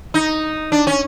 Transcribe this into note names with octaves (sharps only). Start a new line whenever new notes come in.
D#4
D4
C#4